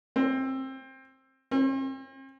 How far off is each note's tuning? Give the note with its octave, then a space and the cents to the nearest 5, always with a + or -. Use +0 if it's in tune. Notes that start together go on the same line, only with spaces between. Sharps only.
C4 +20
C4 +45